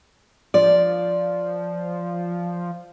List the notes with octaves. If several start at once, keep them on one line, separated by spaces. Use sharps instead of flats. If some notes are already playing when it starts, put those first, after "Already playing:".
F3 D5